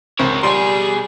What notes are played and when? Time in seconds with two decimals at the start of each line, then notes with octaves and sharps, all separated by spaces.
0.19 C#2 C4 A#4 C#5
0.43 B2 G3 G#4 C6